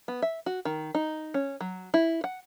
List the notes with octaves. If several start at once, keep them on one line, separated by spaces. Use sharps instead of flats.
B3
E5
F#4
D#3
D#4
C#4
F#3
E4
F#5